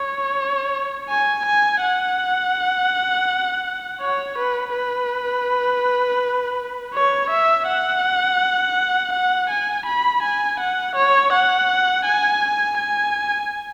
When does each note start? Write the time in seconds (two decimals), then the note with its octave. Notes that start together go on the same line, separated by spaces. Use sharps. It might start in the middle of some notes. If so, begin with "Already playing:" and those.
Already playing: C#5
1.09 G#5
1.46 G#5
1.82 F#5
4.01 C#5
4.38 B4
4.74 B4
6.94 C#5
7.30 E5
7.68 F#5
9.12 F#5
9.50 G#5
9.86 B5
10.23 G#5
10.60 F#5
10.95 C#5
11.33 F#5
12.05 G#5
12.78 G#5